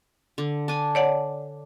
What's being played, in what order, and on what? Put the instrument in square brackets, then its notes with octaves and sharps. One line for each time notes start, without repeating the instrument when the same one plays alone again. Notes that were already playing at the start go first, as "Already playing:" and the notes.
[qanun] D3
D4 G#5
[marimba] C#5 D5 F#5